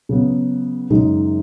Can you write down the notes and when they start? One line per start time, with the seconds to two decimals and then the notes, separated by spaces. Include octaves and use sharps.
0.09 C#3 F#3 B3
0.90 F#2 C#3 G#3 D#4